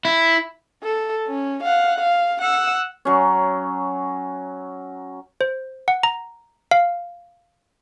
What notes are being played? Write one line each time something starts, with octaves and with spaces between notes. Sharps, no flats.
E4
A4
C#4
F5 F#5
F5
F#5 E6
F#3 C#4
C5
F#5
A#5
F5